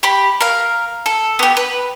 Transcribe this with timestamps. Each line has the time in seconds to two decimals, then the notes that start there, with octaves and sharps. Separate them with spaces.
0.03 G4 B5
0.41 A#4 F5
1.06 A4
1.39 B3 G4
1.57 B4